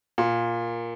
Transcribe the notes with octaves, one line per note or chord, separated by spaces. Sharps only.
A#2